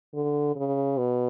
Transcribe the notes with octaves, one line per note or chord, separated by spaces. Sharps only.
D3
C#3
B2